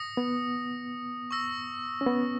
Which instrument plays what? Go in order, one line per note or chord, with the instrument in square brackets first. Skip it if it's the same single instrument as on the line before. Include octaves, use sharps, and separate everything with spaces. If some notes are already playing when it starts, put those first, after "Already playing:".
Already playing: [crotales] D#6 A#6 C#7
[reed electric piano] B3
[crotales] C#6 E6 A#6
[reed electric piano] C#4
B3